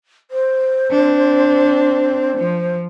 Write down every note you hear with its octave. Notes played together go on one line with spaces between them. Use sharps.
C5
C4 D4
F3